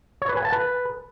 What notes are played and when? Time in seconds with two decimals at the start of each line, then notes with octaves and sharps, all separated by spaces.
0.22 C#5
0.29 B4
0.37 G#5
0.45 A5
0.52 B4